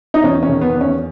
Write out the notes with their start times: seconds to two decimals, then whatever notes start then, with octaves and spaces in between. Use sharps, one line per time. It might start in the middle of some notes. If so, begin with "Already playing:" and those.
0.14 D#4
0.24 E2 C#4
0.43 C#4
0.49 D#3
0.61 B3
0.74 E2
0.81 C#4